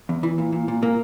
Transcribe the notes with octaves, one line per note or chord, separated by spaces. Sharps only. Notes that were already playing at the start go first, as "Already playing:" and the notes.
E2
E3
A#2
A#2
A#2
A#2 A#3